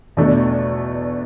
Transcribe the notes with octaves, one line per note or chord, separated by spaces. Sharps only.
E2 B2 A3 D4